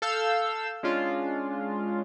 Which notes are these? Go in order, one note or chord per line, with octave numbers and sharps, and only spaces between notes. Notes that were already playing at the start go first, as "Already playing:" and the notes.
A4 F5 E6 G6
G#3 C#4 D4 F4